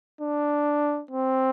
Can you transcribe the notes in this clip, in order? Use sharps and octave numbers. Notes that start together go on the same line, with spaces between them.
D4
C4